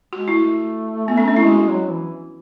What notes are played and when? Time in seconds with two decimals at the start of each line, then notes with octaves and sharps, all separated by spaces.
0.13 G#3 F#4
0.28 E4
0.36 A3
1.08 B3
1.18 C#4
1.28 D4
1.36 E4
1.46 G#3 F#4
1.69 F#3
1.90 E3